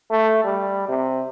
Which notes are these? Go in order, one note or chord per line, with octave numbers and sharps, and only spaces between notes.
A3
G3
C3